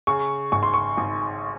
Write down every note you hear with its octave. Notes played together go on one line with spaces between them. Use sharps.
C#3 C#6
G#1 C#6
C6
C#6
G#1